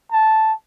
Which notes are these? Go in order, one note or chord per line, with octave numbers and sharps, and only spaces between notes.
A5